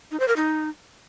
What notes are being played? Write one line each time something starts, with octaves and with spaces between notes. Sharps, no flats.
D#4
C5
A#4
D#4